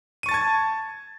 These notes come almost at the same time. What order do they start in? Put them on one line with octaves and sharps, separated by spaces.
D#7 C#6 A6 A5 G#6